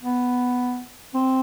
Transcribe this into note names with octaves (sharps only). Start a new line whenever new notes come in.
B3
C4